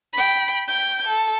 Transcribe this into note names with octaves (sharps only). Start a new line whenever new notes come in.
G5 B5
G5 G6
A4